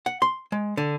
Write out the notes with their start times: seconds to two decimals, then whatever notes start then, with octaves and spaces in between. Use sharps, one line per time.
0.06 F#5
0.22 C6
0.52 G#3
0.77 D3